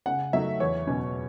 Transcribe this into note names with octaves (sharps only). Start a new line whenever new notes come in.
C#3 F#5
F#3 A3 D#4 E5
E2 C#5
B2 F#3 C#4